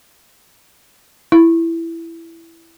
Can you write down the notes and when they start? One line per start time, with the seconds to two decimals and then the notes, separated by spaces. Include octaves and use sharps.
1.32 E4